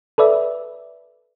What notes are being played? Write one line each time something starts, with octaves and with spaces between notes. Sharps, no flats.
A4 B4 D5 E5